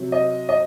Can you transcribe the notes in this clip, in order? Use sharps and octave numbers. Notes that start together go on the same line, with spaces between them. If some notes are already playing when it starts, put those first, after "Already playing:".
Already playing: C3 F#3
D#5
D#5